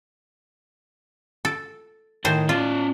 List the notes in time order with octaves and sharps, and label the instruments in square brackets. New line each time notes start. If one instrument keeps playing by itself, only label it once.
[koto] A4
[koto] A2 C5 G#5 [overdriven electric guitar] D#3
[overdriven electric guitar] C#4 D5 [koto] F4